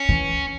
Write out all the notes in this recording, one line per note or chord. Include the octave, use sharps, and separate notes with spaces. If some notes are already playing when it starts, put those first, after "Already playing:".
Already playing: C#4
E3